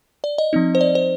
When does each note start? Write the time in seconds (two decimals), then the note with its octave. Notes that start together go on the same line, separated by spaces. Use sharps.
0.24 D5
0.38 D#5
0.53 F3 C4 D#4
0.75 C5
0.81 D5
0.95 C5